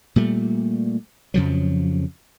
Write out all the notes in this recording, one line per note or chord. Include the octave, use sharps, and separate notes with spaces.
A#2 G3 A3
F2 C#3 F3 F#3